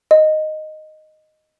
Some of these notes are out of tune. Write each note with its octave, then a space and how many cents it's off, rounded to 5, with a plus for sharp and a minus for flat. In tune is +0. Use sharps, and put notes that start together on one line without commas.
D#5 -5